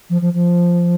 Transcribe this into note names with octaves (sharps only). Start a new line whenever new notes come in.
F3
F3
F3